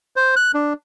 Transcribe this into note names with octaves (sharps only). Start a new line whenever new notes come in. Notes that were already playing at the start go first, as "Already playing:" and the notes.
C5
F#6
D4